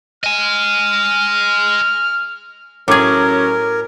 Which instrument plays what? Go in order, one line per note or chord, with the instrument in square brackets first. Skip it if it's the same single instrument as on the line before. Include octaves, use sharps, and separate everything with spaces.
[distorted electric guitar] D#5 G#5 [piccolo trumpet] F6
[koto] A2 G#4 [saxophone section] F#3 C#4 [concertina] A#4 [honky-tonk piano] D6 G#6